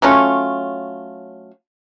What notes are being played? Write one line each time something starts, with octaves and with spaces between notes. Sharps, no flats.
F#3 A3 C#4 F4